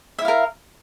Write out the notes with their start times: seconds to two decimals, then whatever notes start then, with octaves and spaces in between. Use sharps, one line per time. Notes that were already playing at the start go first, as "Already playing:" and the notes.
0.19 E5
0.22 E4
0.25 F5
0.28 A#4